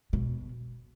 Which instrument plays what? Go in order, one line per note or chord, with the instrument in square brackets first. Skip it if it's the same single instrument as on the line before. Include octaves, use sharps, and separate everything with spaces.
[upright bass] B2